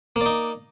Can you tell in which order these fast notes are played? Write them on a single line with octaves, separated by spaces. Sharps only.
A#3 D5 D#4